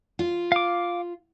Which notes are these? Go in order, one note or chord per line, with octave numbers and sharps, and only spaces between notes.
F4
F5 D6